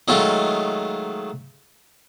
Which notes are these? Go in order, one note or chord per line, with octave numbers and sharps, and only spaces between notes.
D#3 F#3 G#3 A3 F4